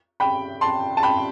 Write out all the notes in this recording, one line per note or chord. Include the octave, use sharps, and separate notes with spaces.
G5 B5
A5 C6
A5
G5 B5